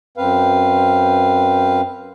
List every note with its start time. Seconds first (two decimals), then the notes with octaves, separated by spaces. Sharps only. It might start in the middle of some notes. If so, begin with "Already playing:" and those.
0.17 F#2 C4 B4 F5